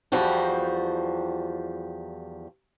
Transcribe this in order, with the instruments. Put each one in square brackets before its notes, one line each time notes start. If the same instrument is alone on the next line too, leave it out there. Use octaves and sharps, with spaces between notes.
[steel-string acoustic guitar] E2 F3 G3 F#4 G5